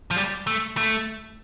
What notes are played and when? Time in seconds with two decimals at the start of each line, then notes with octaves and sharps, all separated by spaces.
0.11 F3
0.16 G3
0.47 A3
0.77 A3